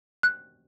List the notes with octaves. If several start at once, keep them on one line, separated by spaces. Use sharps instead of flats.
F#6